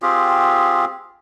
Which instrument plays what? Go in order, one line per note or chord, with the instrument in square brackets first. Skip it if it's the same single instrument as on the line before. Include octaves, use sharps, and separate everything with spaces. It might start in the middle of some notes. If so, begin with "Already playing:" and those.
[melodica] C4 F4 G4 G#4